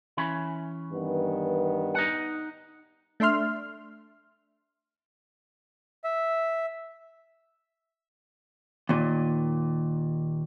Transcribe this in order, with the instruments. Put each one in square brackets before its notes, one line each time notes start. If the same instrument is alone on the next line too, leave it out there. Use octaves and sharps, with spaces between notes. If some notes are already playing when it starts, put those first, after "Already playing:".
[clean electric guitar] E3 C#4 B5
[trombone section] G2 D#3 B3
[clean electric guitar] D#4 F#5
[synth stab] A3 D4 E5 C6 F6
[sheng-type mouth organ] E5
[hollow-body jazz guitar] D#2 A#2